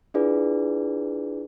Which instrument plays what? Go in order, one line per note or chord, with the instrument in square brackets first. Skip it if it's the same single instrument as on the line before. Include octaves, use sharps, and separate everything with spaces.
[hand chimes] D4 E4 F4 G#4 B4 D5